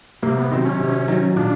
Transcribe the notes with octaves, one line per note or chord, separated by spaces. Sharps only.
C3 A#3
B3
D#3 F#3 C4
C#4
C3
D#3 F#3
A#2 D4